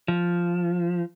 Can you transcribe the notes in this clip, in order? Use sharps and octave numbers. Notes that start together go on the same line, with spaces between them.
F3